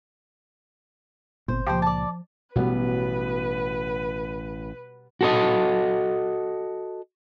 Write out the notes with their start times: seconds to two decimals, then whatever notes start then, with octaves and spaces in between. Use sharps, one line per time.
1.48 G1 A#2 C4 C5
1.67 C#2 A#2 F3 G4 C5
1.82 D5 A5
2.56 A1 B2 F#3 G3 B3 B4
5.21 F#4 A4 D#5